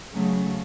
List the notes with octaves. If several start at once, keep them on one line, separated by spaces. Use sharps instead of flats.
C#3 F#3 A3